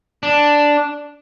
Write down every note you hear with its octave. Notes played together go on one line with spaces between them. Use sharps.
D4